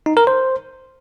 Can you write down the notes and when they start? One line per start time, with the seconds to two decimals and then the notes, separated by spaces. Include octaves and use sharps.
0.06 D#4
0.17 A#4
0.27 C5